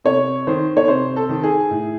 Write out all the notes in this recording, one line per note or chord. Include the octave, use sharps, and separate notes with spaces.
C3 C#5
D#3 C5
C#5
C3 C5
A4
D#3
G#4
A2